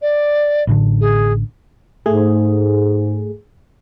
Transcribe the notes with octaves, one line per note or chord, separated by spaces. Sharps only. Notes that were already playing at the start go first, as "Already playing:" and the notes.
D5
A1 A2 D3
G#4
G#2 A3 G#4